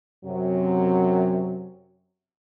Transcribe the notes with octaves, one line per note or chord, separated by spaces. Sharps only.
F#2 C3 F#3